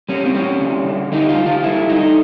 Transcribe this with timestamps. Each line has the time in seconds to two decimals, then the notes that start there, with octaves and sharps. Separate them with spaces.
0.09 G3 C#4
0.25 C4
0.35 G3 C#4
0.60 D3
0.86 D3
1.12 G3 D#4
1.29 F4
1.38 G3
1.46 F4
1.63 D3 E4
1.89 D3 D#4